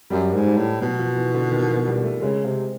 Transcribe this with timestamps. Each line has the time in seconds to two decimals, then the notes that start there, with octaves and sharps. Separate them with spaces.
0.10 F#2 G3
0.34 G#2
0.47 G3
0.58 A2
0.81 B2 F#3
0.99 F3
1.16 E3
1.34 D3
1.51 D#3
1.68 F3
1.87 G3
2.04 A3
2.22 C#3 G#3
2.45 C3